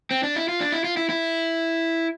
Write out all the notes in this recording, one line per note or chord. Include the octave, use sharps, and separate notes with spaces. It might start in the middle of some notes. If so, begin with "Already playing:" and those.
C4
D4
E4
F4
D4
E4
F4
E4
E4